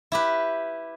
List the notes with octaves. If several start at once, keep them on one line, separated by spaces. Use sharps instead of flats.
E4 G4 B4